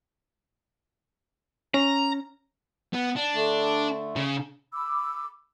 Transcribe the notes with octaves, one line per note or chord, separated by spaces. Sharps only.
C#4 A#5
B3
D4
D3 A3
C#3
B5 D6 E6